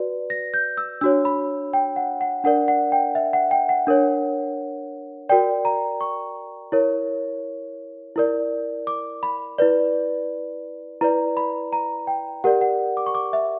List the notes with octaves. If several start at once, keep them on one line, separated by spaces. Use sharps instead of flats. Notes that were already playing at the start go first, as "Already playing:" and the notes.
Already playing: F#4 B4 D5
A#6
G6
E6
D4 F#4 C#5 E6
B5
G5
F#5
F#5
D4 A#4 D5 F#5
F#5
G5
E5
F#5
G5
F#5
D4 A#4 C#5
F#4 A#4 D5 G5
A#5
C#6
E4 A#4 C#5
E4 A#4 D5
D6
B5
E4 B4 D5
E4 B4 D5 A#5
B5
A#5
G5
G4 A#4 D5 F#5
F#5
D6
C#6
D6
E5